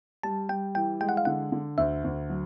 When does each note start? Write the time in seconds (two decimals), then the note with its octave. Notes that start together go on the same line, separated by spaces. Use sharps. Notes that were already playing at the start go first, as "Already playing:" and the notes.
0.23 G3 A5
0.49 G3 G5
0.75 E3 G5
1.01 G#3 G5
1.09 F#5
1.17 F5
1.25 D3 F#5
1.52 D3
1.78 D2 E5
2.04 D2
2.30 F#3